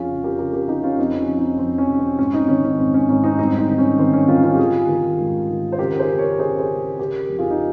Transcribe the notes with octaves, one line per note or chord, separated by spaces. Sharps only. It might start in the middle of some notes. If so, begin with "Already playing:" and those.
Already playing: F2 C#4 F4 G#4
C#3
G4 A#4
C#3 G4 A#4
G4 A#4
C#3 D#4 G4
C#4 F4
F2 C4 D#4
C#4
F2
C4 D#4
F2 C4
C#4
C3
C4
G#2 C#4
C4 D#4
D#3 C#4
C#4
G#2 C4
C#4
G#2 C#4
C4 D#4
G2 C4 D#4
C4 D#4
D#3
C#4
D#3 C4
C#4
D#3 C#4 F4
C#4 F4
G4
D#3 F4 G#4
D#3
G#2
D#3
C5
C#3 G4 A#4
A#4
G#4 C5
C#3
A#4 C#5
C#3 G#4 C5
G#4 C5
C#3
C#3 G4 A#4
F2
F4 G#4
D#4